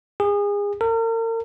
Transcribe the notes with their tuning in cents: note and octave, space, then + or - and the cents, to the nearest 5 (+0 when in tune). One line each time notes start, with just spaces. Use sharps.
G#4 -30
A#4 -40